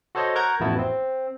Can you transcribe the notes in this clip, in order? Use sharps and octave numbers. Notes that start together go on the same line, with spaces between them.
F#4 A4 C5 C#5 D#5
A#4 F#5 A#5 C#6 G6 G#6
A1 F2 B3 E4 F#4 A5
C4